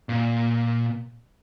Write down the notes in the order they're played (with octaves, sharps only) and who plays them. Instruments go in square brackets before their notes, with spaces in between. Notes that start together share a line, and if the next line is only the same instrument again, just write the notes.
[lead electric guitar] A#2